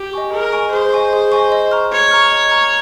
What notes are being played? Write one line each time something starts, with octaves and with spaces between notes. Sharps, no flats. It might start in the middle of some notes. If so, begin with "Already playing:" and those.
Already playing: G4
D#5 G#5 C#6
G#4 A#4
D#5 G#5 C#6
G#4 C5
D#5 G#5 C#6
G#4
D#5 G#5 C#6
D#5
A#5 C#6 F6
C#5 D#5
A#5 C#6 F6
D#5
A#5 C#6 F6